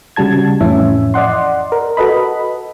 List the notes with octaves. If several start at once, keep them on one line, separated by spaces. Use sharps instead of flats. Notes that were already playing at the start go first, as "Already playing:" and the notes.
C#3 G3 F#4 A5 G#6
F2 A2 E3 C#4 E5
D5 D#5 F#5 C6
A#4
F#4 A4 B4 D#5 B5